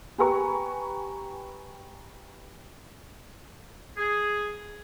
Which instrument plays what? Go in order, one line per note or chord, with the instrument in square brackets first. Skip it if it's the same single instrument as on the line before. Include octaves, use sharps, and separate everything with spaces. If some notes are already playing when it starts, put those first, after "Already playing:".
[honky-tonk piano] G4 B4 G#5 A#5 B5 C#6
[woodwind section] G#4